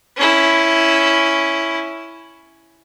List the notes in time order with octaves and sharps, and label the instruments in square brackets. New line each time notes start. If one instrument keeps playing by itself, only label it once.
[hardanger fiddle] C#4 E4